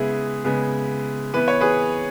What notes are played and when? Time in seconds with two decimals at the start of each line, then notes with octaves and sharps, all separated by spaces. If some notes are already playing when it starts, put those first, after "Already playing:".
Already playing: C#3 G#3 B3 E4 G#4
0.45 C#3 G#3 B3
1.33 E3 B3 B4
1.48 C#5
1.61 G#4 B4